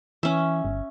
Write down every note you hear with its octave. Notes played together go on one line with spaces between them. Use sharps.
E3 C#4 E5
G1